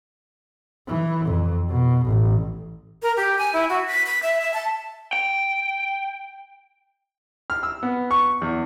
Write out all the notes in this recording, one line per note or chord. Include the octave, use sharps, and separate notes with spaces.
E3
F2
B2
A1
A#4
G4
G#5
E4
F#4
B6
B6
E5
E5
A5
G5
F6
E6
B3
C#6
E2